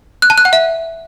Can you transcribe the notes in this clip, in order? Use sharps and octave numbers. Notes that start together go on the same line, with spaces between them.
F#6
A5
F#6
F#5
E5